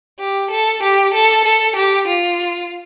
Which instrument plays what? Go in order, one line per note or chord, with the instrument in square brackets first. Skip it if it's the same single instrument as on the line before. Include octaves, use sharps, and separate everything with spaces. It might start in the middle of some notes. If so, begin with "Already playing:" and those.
[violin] G4
A4
G4
A4
A4
G4
F4